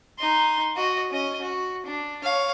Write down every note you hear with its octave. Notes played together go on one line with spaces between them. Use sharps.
D#4 C6
F#4 D#5
C#4 D#5
F#4
D4
C#5 F5